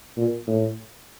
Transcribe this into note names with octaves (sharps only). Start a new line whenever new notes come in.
A#2
A2